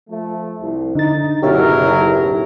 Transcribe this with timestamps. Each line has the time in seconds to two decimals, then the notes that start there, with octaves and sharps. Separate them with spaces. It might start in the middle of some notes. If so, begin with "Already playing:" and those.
0.10 F3 A3
0.61 C2
0.95 D3 D#4 A6
1.42 F#1 B2 F#3 G4 A#4 C#5 E5
1.82 B1 A2